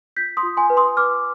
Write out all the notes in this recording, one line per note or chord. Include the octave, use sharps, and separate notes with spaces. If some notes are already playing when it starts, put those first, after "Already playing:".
F4 G6 B6
C6 D#6
F4
G#5 C6
B4
C6 D#6
B4 D6 F6